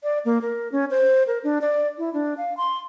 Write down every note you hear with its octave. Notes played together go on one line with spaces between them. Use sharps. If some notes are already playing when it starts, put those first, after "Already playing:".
D5
A#3
A#4
C#4
C5
A#4
D4
D5
E4
D4
F5
C6